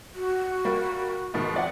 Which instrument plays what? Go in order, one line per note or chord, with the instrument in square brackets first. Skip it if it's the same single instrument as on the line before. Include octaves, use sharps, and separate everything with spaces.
[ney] F#4
[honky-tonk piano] G3 A#3
G#2 B2 D#3
F2 D5 F#5